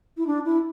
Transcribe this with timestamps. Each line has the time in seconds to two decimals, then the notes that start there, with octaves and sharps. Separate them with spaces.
0.17 E4
0.26 D4
0.45 E4